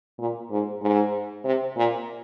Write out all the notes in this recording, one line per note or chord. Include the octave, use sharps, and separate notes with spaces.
A#2
G#2
G#2
C3
A#2